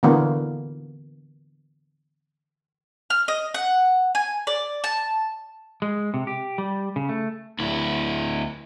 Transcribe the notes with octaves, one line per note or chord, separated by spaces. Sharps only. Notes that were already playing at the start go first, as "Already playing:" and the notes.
D3 E3 A#3 B3
F6
D#5
F#5
G#5
D5
A5
G#3
C3
G4
G3
C#3
A3
D2 E4